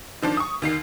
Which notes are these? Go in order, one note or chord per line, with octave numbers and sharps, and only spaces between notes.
D#3 F3 D4
C#6 D#6
D#2 D#3 C7